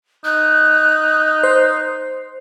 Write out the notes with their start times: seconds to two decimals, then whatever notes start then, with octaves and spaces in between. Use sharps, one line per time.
0.25 D#4 F#6
1.43 C5